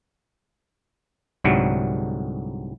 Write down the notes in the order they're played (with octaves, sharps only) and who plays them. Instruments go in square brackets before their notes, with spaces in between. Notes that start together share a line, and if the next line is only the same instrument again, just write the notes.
[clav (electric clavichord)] C2 G#2 D3 F#3 G3 A3